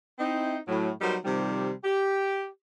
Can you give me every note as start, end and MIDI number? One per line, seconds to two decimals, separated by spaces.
0.19 0.57 60
0.19 0.57 63
0.19 0.57 64
0.68 0.90 45
0.68 0.90 54
1.01 1.15 54
1.01 1.15 55
1.01 1.15 59
1.01 1.15 63
1.01 1.15 70
1.01 1.15 72
1.24 1.71 48
1.24 1.71 51
1.24 1.71 53
1.24 1.71 55
1.84 2.47 67